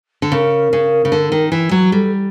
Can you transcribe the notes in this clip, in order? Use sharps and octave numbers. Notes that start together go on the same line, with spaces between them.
D3
C#3 A#4
C#3
C#3
D3
D#3
E3
F#3
G3 A4